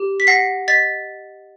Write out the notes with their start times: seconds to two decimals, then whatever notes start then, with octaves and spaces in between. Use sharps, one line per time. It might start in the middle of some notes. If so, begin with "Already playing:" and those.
Already playing: G4
0.20 B6
0.27 F#5 A#6 C7
0.68 D#5 A6 B6